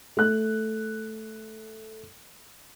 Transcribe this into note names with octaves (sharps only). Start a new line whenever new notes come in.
A3 F#6